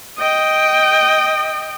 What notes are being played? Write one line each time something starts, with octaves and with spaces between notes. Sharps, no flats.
D#5 G5